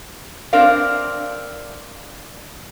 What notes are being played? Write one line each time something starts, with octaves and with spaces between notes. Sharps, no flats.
C4 D4 A#4 D5 F5